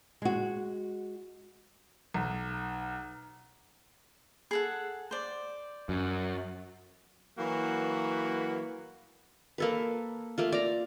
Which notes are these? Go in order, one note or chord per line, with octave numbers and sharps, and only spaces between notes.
G#3 F#4
B1
G#4 A4 F#5
C5 D5
F#2
E3 F#3 A#3 F#4 B4
A#3 A4 B4
A3 A#3 F4
D5 A#5